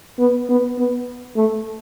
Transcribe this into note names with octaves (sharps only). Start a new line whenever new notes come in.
B3
B3
B3
A3